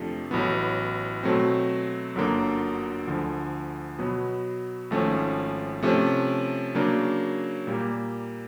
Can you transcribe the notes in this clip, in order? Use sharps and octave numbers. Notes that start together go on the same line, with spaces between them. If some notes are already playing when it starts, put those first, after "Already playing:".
Already playing: F2 C3 F3 A3 D4
A1 A2 F#3 B3
B2 F#3 A3 C4
G1 F#2 D3 F#3 A#3
D2 D3 F3
B2 F#3 B3
G#1 G#2 F3 A3 C#4
C3 F3 A3 C#4
C#3 F#3 A#3 D4
A#2 G3 A#3